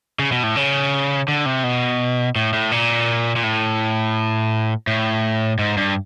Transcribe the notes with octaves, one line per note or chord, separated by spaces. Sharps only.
C#3
B2
A2
C#3
D3
C3
B2
A2
A2
A#2
A#2
A2
A2
G#2
G2